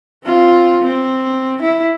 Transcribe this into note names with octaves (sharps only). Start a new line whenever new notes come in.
C4 F4
C4
E4